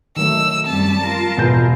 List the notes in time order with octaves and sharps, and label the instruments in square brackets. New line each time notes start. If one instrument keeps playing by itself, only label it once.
[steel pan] D#3 F#3 A3 [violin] E6
[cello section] F#2 G3 [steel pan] C4 [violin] A5
[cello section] F4 A#4
[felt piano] E1 G6 [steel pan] B3